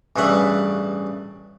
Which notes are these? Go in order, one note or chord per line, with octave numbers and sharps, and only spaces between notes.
A1 G2 C#3 E3 E5 F#5